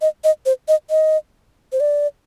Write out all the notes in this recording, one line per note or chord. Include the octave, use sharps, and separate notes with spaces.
D#5
D#5
C5
D#5
D#5
C5
D5